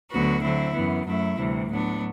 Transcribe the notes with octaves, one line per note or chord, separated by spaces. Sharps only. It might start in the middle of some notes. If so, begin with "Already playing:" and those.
D2 D3 F#3 B3 F#4
D3 F#3 C4 E4
F#2 E3 B3
F#2 F#3 A3 E4
D2 C3 E3 G3
A2 F#3 B3 D4